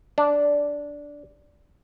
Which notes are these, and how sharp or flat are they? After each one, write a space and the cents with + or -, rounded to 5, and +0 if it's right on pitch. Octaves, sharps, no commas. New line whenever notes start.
D4 -10